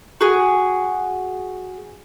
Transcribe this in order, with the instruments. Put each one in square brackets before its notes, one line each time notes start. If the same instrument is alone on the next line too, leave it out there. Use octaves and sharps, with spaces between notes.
[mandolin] F#4 G#4